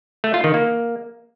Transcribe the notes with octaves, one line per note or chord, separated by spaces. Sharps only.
A3
F4
D#3
A#3